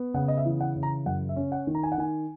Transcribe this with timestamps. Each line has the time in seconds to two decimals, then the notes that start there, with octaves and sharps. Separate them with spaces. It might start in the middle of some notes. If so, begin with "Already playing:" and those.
Already playing: B3
0.14 C#3 F#5
0.28 D#5
0.37 E5
0.45 E3
0.60 F#5
0.76 C#3
0.83 A#5
1.06 F#2 F#5
1.29 E5
1.36 C#4
1.52 F#5
1.67 D#3
1.75 A#5
1.83 G#5
1.92 F#5
1.98 D#3 G#5